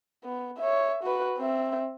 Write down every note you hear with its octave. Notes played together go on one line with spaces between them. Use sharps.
B3
C#5 E5
F#4 B4
C4 E5